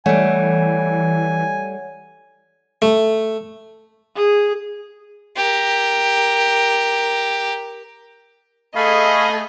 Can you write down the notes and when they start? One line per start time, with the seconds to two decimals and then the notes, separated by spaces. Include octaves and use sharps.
0.06 E3 G3 A3 C#5 F#5 G#5
2.82 A3
4.16 G#4
5.36 G4 A#4
8.75 A3 G#4 D#5 F5 B5